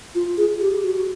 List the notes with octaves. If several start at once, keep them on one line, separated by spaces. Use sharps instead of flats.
F4
G#4
G4
F#4